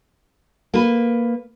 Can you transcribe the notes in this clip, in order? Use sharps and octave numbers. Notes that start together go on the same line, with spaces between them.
A#3 B4